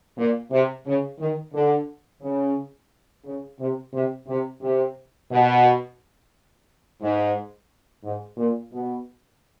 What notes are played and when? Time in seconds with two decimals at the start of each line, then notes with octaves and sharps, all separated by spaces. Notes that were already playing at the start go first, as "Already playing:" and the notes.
0.17 A#2
0.51 C3
0.85 C#3
1.19 D#3
1.53 D3
2.21 C#3
3.24 C#3
3.58 C3
3.92 C3
4.26 C3
4.61 C3
5.30 B2
7.01 G#2
8.03 G#2
8.37 A#2
8.72 B2